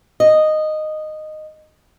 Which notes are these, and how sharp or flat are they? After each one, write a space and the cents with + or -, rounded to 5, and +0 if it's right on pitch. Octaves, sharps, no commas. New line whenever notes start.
D#5 -10